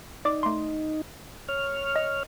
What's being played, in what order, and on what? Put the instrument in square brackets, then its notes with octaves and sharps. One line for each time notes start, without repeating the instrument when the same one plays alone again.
[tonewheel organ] D#4 [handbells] D5 D6
[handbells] A3 C6
[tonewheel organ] C#5 F6
[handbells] D#5